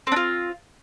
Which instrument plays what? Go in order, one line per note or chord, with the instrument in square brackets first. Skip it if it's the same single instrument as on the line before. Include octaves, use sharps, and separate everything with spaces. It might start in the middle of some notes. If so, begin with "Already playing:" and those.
[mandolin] C4
D4
F4